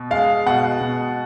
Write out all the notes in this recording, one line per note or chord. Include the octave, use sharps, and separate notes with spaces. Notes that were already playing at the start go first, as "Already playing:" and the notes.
Already playing: B2
G#3 F5
B2 F#5
B2